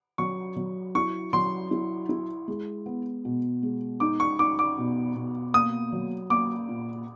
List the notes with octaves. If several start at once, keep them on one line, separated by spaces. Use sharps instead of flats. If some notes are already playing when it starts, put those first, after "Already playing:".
F#3 C#6
F#3
E4 C#6
F#3 C6
E4
E4
G#3
B3
B2
G#3
D#4 D6
C#6
D#4 D6
D6
B2
B2
A#3 D#6
F#3
A#3 D6
A#2